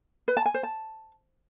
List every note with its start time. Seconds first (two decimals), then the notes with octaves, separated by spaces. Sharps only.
0.28 B4
0.37 A5
0.46 G#5
0.54 C5
0.63 A5